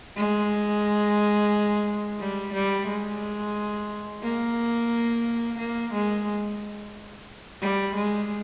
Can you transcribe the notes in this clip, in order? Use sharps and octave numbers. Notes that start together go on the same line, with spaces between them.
G#3
G3
G3
G#3
A#3
A#3
G#3
G3
G#3